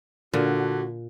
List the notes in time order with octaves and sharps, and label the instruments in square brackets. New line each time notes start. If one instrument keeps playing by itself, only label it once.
[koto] A#2 [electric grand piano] D3 [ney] D4 [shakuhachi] F#4